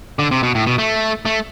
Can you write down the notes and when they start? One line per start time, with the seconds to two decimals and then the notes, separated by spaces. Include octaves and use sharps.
0.19 D3
0.31 C3
0.43 B2
0.55 A2
0.67 B2
0.78 A3
1.25 A3